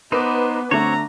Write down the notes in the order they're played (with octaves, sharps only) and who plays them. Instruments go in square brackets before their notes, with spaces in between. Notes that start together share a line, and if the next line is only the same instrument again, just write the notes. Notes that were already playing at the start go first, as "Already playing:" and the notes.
[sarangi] B3 [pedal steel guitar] D#4 C5 [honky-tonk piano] B4 D6
[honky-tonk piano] D3 A3 [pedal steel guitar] C4 F#4 C#5 [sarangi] A#5